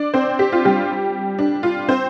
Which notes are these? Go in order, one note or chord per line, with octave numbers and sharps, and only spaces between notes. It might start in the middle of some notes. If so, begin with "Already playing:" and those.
Already playing: D4 D5
C4 C5
G4
F4
G3 G4
D4
F4
C4 C5